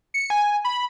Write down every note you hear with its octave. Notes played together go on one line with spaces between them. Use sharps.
C#7
G#5
B5